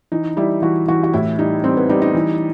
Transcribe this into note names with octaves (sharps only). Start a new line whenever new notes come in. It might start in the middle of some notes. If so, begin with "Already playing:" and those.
E3 D#4
G3 E4
E3 F#4
E3 F#4
F#4
A2 E4
G3 D#4
G3 C4
B3
G3 D#4
D#4
E3